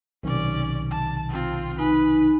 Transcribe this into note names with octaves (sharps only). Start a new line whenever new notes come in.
B1 C3 D#3 C#4 D5
A5
C4 F4
D#4 B4 G#5